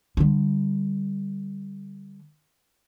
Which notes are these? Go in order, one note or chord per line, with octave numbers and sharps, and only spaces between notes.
D3 G3